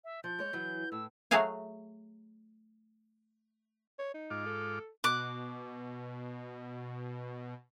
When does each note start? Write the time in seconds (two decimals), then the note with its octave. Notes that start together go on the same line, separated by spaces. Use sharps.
0.04 E5
0.24 F3 G6
0.39 G#3 C#5
0.53 E3 F#3
0.92 A2 E6
1.31 F#3 A3 F#4 G#4 F5 G#5
3.99 C#5
4.14 D#4
4.30 G#2 F4 D6
4.46 A4
5.04 B2 D6 F#6